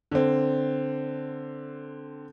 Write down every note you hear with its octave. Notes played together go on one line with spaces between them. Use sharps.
D3 C4